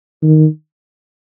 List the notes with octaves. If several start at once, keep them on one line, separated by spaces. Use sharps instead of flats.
D#3